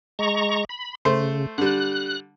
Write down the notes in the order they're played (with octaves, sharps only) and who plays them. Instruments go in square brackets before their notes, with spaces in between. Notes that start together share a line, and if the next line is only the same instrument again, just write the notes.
[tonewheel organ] G#3 A#5 C#6
B5
[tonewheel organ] C#3 [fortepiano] A3 C5
[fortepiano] D3 G3 [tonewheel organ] F#6